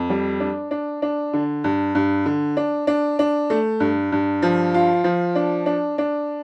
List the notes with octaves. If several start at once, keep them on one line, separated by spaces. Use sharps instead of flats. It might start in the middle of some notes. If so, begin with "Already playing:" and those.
Already playing: F2
G3
D4
D4
D4
D3
G2
G2
D3
D4
D4
D4
A3
G2
G2
F3
F4
F3
D4
D4
D4